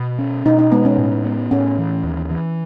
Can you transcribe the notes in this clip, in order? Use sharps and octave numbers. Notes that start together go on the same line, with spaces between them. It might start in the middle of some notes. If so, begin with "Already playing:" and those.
Already playing: B2
C#4
B2 D#4
D#4
G#3 B3
C#4
A2
B3
A2 C#4
E3
D#2
E3